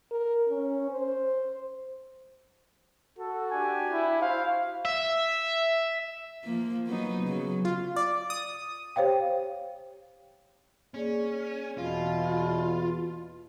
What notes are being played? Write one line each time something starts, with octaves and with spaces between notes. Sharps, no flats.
A#4
C#4
C5
F#4 A4
D4 G4 G#5
E4
F#4 C5 F5
E5
F3 A#3
F#3 B3 D#4
C#3 F#3
F4
D5
D#6
G4 C5 C#5 F5 G5
A#3 C#4 G#4 D5
E2 B2 F4